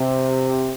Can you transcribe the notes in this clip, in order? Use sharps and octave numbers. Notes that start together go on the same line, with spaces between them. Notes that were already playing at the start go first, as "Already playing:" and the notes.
Already playing: C3